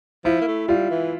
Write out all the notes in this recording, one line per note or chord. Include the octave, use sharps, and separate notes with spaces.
F3 E4
A#3
A3
G3 F4
E3